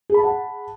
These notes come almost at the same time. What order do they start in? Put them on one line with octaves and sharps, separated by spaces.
G#4 B5 A5 F#5